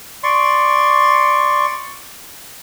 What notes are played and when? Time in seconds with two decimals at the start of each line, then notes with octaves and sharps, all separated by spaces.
0.23 D5 C6 C#6